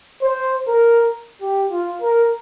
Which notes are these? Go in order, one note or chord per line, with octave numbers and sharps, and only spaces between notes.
C5
A#4
G4
F4
A#4